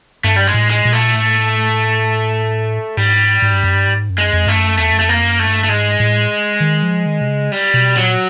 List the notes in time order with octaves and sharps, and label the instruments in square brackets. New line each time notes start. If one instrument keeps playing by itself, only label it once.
[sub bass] G2 [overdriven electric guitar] A3
[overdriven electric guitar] G3
G#3
[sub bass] A2
[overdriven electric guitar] G#3
[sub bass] A#2
[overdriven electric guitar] A3
[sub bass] A2
[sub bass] G#2 [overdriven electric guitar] G3
[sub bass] G#2
G2
F#2
G2
G#2
F#2
[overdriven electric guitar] G#3
[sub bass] F2
[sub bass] G2 [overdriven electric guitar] A3
[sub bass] F#2
[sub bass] E2 [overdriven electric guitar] A3
[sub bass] F#2
[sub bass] F2 [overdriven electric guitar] A3
[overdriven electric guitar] A#3
[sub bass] F#2
[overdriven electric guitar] A3
[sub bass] G2
[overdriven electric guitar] A3
[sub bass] G#2 [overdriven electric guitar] G#3
[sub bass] A2
D#3
F3
D#3
C3
C#3
[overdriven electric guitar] G3
[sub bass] B2
[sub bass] A#2 [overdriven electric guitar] F#3